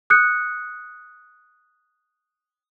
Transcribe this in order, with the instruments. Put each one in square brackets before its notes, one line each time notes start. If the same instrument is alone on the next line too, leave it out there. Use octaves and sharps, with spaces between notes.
[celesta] D#6 F#6 G6 C#7